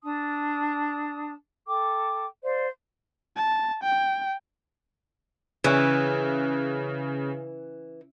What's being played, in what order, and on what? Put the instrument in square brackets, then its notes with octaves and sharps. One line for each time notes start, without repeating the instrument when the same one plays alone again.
[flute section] D4 A5 D#6
A4 G5 D6
C5 D5 F5
[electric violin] A5
G5
[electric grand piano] C#3 [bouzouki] E3 [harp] C#4 E5 D#7